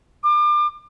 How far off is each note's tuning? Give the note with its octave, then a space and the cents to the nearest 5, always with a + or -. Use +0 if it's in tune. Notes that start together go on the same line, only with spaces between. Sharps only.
D6 +35